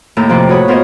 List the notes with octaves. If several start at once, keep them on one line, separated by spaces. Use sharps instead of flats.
D#2 A2 A#5 E6 G6
F2 C3 F3 C4 D6 F#6
F#4 B4 C#5 B5 D#6
B3 F4 A#4 C5 C#5 D#5